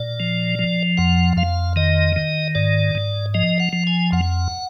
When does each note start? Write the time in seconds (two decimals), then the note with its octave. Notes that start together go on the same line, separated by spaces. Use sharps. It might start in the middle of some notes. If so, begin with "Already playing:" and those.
Already playing: A#2 D5
0.20 F3
0.59 F3
0.97 F2 F#5
1.37 F2 F5
1.76 D#3 D#5
2.16 D#3
2.55 G#2 D5
2.95 G#2
3.34 F3 D#5
3.60 F#5
3.73 F3
3.87 G#5
4.12 F2 F#5